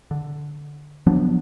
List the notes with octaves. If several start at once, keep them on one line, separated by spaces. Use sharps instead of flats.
D3
F3 F#3 B3 D4